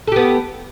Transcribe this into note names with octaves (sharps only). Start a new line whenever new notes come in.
B3 G4 A4